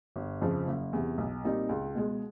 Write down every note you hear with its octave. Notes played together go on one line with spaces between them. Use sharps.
G1
F2 C#3 F3
F#1
E2 C3
B1
A#2 G3 C4 D#4
C#2
B2 G#3